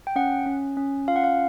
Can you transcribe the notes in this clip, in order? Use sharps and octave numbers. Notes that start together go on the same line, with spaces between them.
G5
C#4 F#5
C#4
C#4
F4 F5
F#5
F5